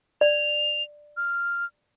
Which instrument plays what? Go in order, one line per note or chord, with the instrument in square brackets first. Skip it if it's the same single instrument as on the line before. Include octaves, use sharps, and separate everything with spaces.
[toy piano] D5 [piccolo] F7
[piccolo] F6